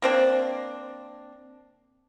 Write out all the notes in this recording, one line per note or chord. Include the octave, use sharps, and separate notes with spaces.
A#3 C4 D4